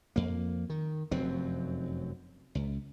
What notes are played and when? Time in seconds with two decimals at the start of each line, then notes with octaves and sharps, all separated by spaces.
0.16 F2 A#3
0.70 D#3
1.11 F1 F#2 F#3 C4
2.55 C#2